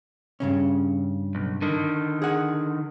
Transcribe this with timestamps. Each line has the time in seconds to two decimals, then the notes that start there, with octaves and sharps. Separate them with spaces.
0.40 G2 C#3 C#4
1.35 B1
1.62 D3 D#3
2.22 G#4 F#5